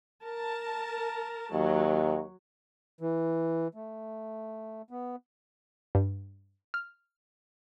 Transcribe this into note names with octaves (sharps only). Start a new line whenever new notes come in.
A#4 A5
D#2 F#3
E3
A3
B3
G2
F6